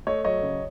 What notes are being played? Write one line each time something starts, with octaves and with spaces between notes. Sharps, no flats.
A3 C#5 D#5
F#3 C#5 D#5
C#3